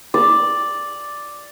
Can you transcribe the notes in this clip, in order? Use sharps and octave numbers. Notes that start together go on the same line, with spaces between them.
D5